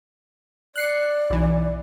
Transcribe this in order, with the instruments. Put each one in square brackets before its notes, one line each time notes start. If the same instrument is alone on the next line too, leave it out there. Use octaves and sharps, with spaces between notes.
[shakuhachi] D5 [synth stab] F#6 C7 C#7
[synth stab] B1 E3